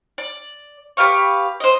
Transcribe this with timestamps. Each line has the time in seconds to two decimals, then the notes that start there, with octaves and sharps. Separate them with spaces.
0.18 D5
0.97 G4 B4 F5 C#6
1.60 C5 D#5